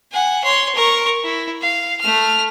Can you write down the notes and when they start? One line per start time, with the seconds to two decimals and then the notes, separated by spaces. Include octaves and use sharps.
0.12 F#5 G#5
0.44 C#5 C6
0.75 A#4 C#6
1.24 E4
1.61 F5
2.01 A3 F6